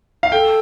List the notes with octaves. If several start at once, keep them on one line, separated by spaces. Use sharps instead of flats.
F5
A4 G5